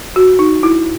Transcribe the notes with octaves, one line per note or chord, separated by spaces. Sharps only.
F#4
D#4
E4